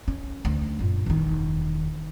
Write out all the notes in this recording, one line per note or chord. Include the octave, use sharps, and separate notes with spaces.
C#4
D2
F#2 A#2
E1 D#3